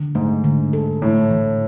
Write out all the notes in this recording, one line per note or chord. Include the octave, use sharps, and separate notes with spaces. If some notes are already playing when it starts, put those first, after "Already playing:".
Already playing: D3
G#2 A3
D3
A4
A2 E3
E3